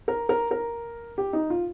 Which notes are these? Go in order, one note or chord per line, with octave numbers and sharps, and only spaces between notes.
A#4
A#4
A#4
G4
D#4
F4